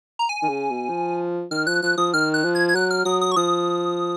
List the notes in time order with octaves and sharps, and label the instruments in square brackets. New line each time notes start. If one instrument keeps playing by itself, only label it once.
[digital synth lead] A#5
G#5
[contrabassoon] D#3
C#3
B2
F3
[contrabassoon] D#3 [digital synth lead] F6
[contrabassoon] F3 [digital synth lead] F#6
[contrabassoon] F3 [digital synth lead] F#6
[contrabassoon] F3 [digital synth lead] D#6
[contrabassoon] D#3 [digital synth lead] F6
[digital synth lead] F#6
[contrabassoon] F3
[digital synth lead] G#6
G#6
[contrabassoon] F#3 [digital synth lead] F#6
[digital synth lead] F6
[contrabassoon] F#3 [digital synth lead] D#6
[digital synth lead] D#6
C#6
[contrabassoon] F3 [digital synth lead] D#6